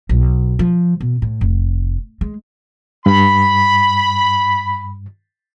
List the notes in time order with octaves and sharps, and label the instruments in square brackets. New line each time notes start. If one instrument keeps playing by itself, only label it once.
[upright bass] B1
F3
B2
A2
F1
G#3
[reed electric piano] G2 [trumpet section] B5